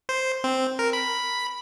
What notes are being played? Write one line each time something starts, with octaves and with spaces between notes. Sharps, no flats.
C5
C4
A#4
B5